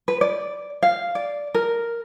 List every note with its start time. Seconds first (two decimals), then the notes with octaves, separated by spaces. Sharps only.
0.08 B4
0.21 D5
0.83 F5
1.15 D5
1.54 A#4